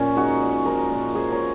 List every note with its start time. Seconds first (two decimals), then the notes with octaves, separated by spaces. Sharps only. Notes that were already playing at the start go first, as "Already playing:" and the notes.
Already playing: A#2 F3 C#4 A#4 C#5
0.16 G#3 D#4 F#4
0.41 A#2
0.66 F3 F#4 A#4
0.91 A#2
1.14 G#3 G#4 C5
1.32 A#4 C#5